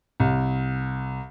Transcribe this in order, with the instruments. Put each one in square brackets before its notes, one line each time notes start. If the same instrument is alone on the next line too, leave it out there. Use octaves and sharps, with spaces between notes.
[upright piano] C2